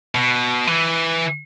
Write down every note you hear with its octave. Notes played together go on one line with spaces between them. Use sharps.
B2
E3